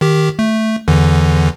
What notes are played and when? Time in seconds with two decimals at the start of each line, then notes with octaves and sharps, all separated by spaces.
0.01 D#3 G4
0.39 A3
0.88 E2 D3 E3